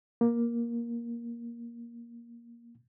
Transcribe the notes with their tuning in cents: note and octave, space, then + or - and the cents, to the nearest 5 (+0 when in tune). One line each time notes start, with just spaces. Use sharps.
A#3 +10